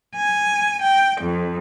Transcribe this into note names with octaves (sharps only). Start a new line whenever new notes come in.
G#5
G5
F2